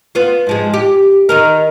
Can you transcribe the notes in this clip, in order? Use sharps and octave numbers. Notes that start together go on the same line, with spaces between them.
B3 F4
G#2 F3 G#3
G4
D#3 D#4 A#4